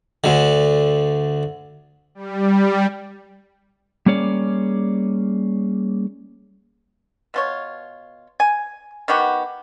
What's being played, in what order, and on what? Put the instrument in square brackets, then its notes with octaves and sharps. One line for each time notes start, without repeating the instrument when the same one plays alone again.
[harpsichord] D2 D3
[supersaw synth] G3
[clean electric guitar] G3 A#3 C#4 G#4 C#5 D5
[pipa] B2 F4 C#5
G#5
D#3 B3 F#4 G4